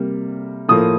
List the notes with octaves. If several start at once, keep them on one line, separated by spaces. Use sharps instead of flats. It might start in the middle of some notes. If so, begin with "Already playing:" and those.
Already playing: C3 G3 A#3
A2 F3 A#3 D#6